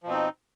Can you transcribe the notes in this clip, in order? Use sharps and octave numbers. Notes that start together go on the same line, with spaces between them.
B2 F3 C4 D#4